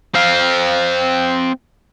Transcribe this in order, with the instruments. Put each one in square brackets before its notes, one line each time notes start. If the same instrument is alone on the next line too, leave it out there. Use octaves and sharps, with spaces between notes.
[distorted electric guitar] C4 F5